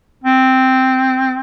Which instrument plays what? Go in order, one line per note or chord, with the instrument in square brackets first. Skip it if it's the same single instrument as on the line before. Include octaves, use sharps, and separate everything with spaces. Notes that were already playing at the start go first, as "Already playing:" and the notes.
[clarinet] C4